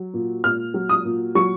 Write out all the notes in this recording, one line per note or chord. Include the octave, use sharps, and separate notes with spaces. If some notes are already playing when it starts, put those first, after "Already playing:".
Already playing: F#3
A#2
A#2 F6
F#3
D#6
A#2
F#3 C#6